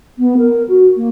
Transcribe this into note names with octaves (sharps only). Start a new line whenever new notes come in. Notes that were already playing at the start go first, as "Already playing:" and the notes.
B3
A#4
F#4
A#3